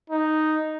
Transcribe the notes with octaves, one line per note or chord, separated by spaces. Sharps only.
D#4